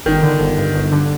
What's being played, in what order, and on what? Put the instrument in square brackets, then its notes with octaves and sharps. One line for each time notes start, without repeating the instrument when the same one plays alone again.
[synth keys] G1 [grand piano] D#3
[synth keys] D3
G1
G2
G1
D3